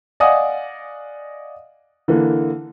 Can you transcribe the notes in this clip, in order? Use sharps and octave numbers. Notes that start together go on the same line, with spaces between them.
D5 D#5 F5 F#5 G#5 D#6
D3 E3 A#3